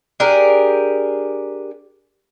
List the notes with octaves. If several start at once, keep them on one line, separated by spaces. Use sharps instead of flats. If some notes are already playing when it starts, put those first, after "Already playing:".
D4 G4 G#4 A#4